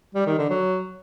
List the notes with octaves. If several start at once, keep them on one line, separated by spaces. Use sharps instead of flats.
G3
D#3
D3
F#3